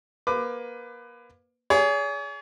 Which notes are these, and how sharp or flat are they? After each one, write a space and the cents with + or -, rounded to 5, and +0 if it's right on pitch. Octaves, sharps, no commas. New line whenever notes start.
A#3 +30 B4 +25 D6 +25
G#4 +0 C#5 +45